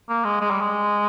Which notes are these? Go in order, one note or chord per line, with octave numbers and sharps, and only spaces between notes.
A#3
G#3
G#3
G3
G#3